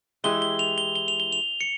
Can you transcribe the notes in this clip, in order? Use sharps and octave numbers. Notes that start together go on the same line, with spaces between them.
E3 G#3 E4 G4 G7
G7
F7
G7
G7
F7
G7
F7
C#7